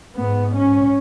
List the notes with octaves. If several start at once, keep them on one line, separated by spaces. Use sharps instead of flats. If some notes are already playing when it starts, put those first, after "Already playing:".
G#2 B3
C#4